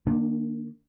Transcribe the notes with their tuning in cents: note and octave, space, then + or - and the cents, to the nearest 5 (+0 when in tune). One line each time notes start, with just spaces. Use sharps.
D#3 -35 A#3 +0 D4 +0